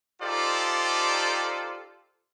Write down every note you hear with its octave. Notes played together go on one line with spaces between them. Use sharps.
D#4 F4 G4 A4 C5 D5